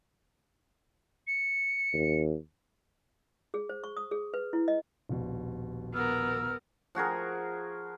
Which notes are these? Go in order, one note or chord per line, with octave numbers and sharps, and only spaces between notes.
C#7
D#2
G#4
C5
C#6
D#6
G#4
B4
E4
D#5
D#1 A#1 B2
B3 A#4 E6 F6
F3 F#4 G#4 A#4